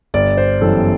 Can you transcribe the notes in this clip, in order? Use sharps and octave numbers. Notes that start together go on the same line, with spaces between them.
G1 D5
C5
F#2 E3 G3 B3 A4